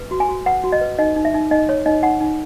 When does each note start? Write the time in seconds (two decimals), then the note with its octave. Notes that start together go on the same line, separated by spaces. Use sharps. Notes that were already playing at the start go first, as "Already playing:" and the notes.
Already playing: B4
0.11 F#4
0.20 G#5
0.29 F#4
0.46 B4 F#5
0.64 F#4
0.72 D#5
0.81 B4
0.98 D#4 D#5
1.16 D#4
1.25 E5
1.34 D#4
1.51 D#4 D#5
1.69 C#5
1.86 D#4 D#5
2.03 D#4 F#5
2.20 D#4